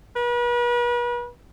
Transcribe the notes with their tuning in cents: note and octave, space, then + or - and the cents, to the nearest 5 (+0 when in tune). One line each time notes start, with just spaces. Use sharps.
B4 -40